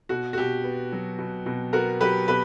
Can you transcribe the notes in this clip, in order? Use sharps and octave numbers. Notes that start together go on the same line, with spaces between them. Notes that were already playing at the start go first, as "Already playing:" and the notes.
B2 F#4
F#4
B2 G4
B3
F#3
B2
B2
B3 F#4 A#4
F#3 G4 B4
B2 G4 B4